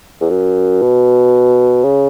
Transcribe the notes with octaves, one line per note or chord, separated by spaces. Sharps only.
E2
F#2
B2
C#3